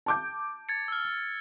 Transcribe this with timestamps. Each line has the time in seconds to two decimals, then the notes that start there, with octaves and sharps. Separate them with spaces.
0.06 A5 D6 G6
0.69 G#6 A6 C#7
0.88 E6 F6